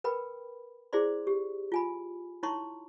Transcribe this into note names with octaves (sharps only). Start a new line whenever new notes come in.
A#4 B4 G5 B5
E4 G#4 C5 D5 C6
G4
F4 G#5 B5
D#4 E4 C#5 A#5 C6 C#6